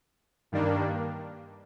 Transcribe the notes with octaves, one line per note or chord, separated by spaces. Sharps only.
G2 D#3 G3 A#3 D4